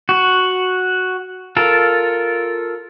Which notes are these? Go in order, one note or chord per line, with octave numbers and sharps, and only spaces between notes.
F#4
F4 A4 A#4